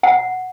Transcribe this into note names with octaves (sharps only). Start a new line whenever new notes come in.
F#5